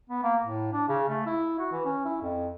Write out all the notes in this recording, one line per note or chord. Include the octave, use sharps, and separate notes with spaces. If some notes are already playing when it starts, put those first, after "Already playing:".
B3
A#3
A2
D4
C#3
A3
E4
F#4
E3
C#4
E4
F2